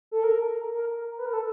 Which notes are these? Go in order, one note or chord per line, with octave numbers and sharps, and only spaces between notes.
A4
A#4
A#4
B4
A#4
A4